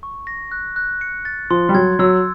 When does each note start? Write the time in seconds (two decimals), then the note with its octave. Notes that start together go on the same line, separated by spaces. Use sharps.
0.03 C#6
0.27 A#6
0.51 F#6
0.76 F#6
1.01 C#7
1.25 A6
1.50 F3 C6
1.69 G3
1.74 F#3 G#6
1.99 F#3 E6